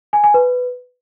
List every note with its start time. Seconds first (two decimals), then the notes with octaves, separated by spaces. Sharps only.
0.13 G#5
0.24 G#5
0.34 B4